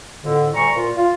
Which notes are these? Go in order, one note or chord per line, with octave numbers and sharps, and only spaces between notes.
F2 A2 D3
D2 G3 G#5 A#5 C#6
A#2 F4
F4